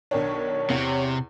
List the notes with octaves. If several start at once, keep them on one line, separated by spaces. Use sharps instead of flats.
B1 D#3 D4 C#5
E2 C3